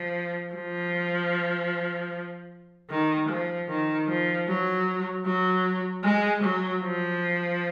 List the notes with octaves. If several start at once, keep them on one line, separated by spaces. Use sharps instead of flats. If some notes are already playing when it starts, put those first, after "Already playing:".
Already playing: F3
F3
D#3
F3
D#3
F3
F#3
F#3
G#3
F#3
F3